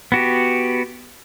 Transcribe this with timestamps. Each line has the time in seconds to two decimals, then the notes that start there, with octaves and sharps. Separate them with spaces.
0.12 B3 F#4 G4